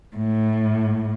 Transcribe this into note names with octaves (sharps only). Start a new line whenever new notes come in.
A2